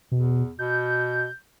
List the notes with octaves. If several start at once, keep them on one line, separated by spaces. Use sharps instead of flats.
E2 B2
B2 G6